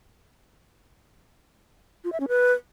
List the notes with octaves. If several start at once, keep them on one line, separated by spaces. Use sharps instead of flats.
F4
E5
C#4
B4